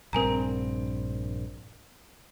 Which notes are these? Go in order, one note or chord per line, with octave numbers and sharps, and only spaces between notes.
A#1 G2 C4 A#4 G#5 A#5